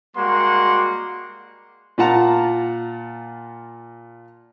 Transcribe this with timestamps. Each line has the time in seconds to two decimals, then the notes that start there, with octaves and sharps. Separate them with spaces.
0.16 G3 G#3 A#3 F#4 F#5 C6
1.98 A#2 F4 F#5 A5 A#5